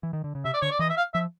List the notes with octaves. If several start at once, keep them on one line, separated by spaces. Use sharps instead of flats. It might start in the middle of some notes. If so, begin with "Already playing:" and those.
E3
D#3
D3
C#3
C3 E5
D5
D3 C#5
D5
E3 D#5
E5
F5
F3 E5